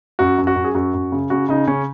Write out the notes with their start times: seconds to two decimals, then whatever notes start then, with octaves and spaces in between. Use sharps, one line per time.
0.19 F#2 F#4
0.38 F#2
0.47 F#4
0.56 F#2
0.64 G#4
0.75 F#2 F#4
0.94 F#2
1.12 C#3
1.30 C#3 F#4
1.49 C#3 D#4
1.67 C#3 C#4